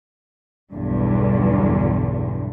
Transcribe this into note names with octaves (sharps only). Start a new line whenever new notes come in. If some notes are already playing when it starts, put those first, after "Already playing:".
B1 E2 G2 D3